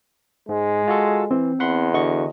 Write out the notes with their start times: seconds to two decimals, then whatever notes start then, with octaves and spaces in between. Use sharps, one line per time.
0.49 G#2 G#3
0.88 F4 F#4 A4
1.31 E3 C4
1.60 E2 F#5 B5 C6
1.94 D3 F#4 D#5 C#6